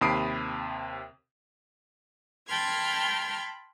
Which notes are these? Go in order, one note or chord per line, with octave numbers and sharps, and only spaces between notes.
D#2 C3 B5 D#6 C7 D7
G5 A5 B5 C6 F6 G#6